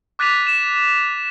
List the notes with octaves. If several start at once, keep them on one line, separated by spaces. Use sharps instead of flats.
D6 F#6 A6 B6 D#7 F7
E7